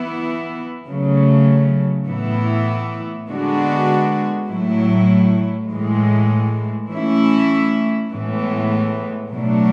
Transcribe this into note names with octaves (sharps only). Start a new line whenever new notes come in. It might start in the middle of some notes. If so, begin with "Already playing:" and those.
Already playing: E3 B3 E4
C#3 F#3 A3
A2 E3 B3 E4
D3 G#3 B3 D4 F#4
A2 F#3 A3 E4
A2 E3 G#3
E3 A3 C#4 E4
A2 E3 G#3 B3
B2 F#3 A3 D4